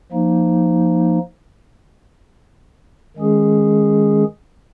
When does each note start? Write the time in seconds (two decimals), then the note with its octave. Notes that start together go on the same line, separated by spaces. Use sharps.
0.12 F3 A#3 D#4
3.16 D#3 G#3 C#4 G#4